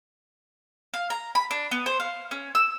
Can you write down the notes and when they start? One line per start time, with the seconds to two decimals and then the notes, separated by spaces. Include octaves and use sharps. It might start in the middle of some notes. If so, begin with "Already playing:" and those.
0.94 F5
1.10 A#5
1.35 B5
1.51 D4
1.71 B3
1.86 C5
2.00 F5
2.31 C#4
2.55 E6